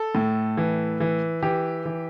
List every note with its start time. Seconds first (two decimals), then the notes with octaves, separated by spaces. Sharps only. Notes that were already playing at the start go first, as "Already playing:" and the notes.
Already playing: A4
0.15 A2
0.57 E3
1.00 E3
1.43 E3 G4
1.85 E3